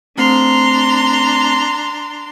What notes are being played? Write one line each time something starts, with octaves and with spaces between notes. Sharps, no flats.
A3 C4 D4 A#5 C6 C7